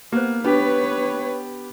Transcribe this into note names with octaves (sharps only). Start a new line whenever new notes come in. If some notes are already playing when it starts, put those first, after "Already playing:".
A#3 B3 G4 C5
B3 D4 G4 B4 C#5